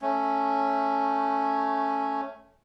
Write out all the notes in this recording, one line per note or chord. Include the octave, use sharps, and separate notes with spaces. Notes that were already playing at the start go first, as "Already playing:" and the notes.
A3 C#4